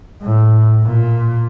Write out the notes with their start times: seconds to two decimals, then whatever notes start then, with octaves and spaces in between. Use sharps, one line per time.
0.22 A2
0.84 A#2